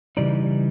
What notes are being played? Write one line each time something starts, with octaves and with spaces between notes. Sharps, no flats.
C#3 E3 G3 D#4 D5